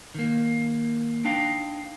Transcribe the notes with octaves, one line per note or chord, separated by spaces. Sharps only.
D#3 A#3
D4 D#4 F5 G5